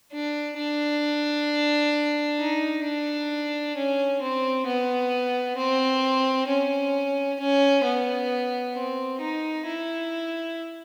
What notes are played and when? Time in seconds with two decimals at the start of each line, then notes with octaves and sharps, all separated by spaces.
0.12 D4
0.57 D4
2.39 D#4
2.85 D4
3.76 C#4
4.22 C4
4.66 B3
5.57 C4
6.48 C#4
7.39 C#4
7.85 B3
8.75 C4
9.21 D#4
9.66 E4